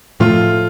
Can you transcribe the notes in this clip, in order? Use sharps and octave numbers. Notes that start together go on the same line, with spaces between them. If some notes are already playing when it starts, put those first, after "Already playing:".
A2 F3 A3 F4